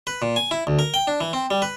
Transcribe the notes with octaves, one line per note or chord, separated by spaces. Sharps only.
B4
A#2
G#5
E4
D2
A#4
G5
D4
E3
C4
G3
B4